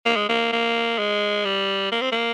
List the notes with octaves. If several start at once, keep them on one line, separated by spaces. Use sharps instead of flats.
A#3
G#3
A#3
A#3
G#3
G3
A#3
C4
A#3